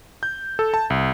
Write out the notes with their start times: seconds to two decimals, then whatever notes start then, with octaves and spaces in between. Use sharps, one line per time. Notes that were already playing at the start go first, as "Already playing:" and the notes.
0.23 G6
0.59 A4
0.74 A5
0.90 C2